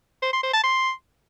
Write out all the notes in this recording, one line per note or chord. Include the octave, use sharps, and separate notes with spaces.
C5
C6
C5
A5
C6